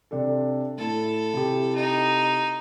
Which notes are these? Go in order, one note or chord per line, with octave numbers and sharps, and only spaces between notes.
C3 D4 A4
A2 E4 A4
C3 E4 G4
D#4